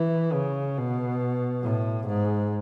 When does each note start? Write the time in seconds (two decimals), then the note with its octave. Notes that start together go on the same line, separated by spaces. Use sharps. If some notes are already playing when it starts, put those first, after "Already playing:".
Already playing: E3
0.32 C#3
0.77 B2
1.63 A2
2.08 G#2